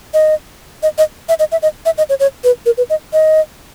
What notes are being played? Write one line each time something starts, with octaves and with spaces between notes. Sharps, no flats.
D#5
D#5
D#5
E5
D#5
E5
D#5
E5
D#5
C#5
C#5
B4
A#4
B4
D#5
D#5